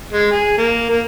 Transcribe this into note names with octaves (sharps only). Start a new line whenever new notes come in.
G#3
G#4
A#3
A#3